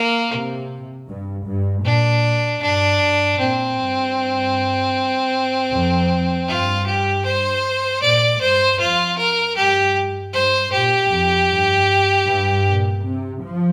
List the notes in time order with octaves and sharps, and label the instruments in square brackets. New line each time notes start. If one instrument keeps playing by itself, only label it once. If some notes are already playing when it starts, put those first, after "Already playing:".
Already playing: [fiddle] A#3
[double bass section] C3
G2
G2
[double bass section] A#2 [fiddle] D4
[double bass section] A#2
[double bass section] G2 [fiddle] D4
[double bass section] G2
[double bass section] A#2 [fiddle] C4
[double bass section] G2
F2
[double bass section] G2 [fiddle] F4
[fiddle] G4
C5
[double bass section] A#2 [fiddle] D5
[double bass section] G2 [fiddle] C5
[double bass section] F2 [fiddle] F4
[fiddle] A#4
[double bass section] G2 [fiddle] G4
[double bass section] G2 [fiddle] C5
[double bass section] A#2 [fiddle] G4
[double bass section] F2
G2
G2
A#2
C3
F3